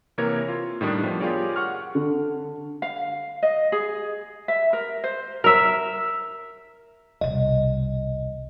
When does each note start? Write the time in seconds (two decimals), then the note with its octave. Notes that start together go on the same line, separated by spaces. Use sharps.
0.18 C3 E3 A#3 A#4 C#5 G#6
0.48 F4
0.81 A2 D#3 G3 D4
1.03 F3 G3 B3
1.20 F4 G4 G#4 A#4 C#5 D5
1.56 F#5 C#6 F6
1.95 D3
2.82 F5
3.43 D#5
3.72 G#4
4.48 E5
4.73 A#4
5.04 C5
5.44 A#4 E5
7.21 E1 C2 D#5